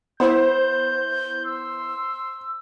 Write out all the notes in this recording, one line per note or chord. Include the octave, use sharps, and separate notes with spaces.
B3 E4 C5 G6
C6 E6